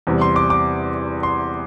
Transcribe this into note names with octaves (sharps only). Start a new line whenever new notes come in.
E2 C3 G3
C6
D6
D6
C6